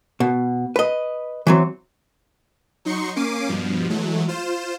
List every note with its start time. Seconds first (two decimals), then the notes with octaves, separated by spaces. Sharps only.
0.20 B2
0.76 B4 D#5
1.47 E3 F#3 C4
2.85 F#3 D#4 C6 C#6 C#7
3.16 A#3 C#4 D6 C7 D#7
3.49 G2 B2 F3
3.89 E3 F#3 G#3 A3
4.28 F4 C5 E7